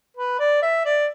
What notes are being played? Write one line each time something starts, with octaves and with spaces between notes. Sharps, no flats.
B4
D5
E5
D5